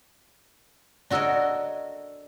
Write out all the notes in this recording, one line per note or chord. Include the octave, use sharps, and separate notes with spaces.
D4 F#4 A4 A#4 C#5 D#5